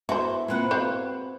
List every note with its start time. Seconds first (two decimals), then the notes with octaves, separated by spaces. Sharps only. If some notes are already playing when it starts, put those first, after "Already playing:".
0.09 B3 E4 F#4 C5
0.48 A#2 C4 G#4 B4 F#5
0.71 C4 F#4 C5 F5 G5